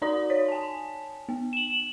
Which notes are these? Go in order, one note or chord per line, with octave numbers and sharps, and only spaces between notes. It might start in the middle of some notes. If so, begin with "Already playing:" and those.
D#4 F#4 D5 A#5 C6 D#6
C#5 B6
G#5 A5
B3
E7 F#7